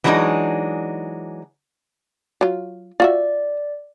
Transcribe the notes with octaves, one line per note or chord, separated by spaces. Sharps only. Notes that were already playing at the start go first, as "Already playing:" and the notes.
E3 F#3 G#3 D4 D#4
F#3 F4
F4 F#4 D5 E5